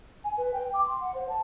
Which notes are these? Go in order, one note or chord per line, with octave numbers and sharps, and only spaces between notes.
G#5
B4
G5
D6
C6
F#5
C5
A5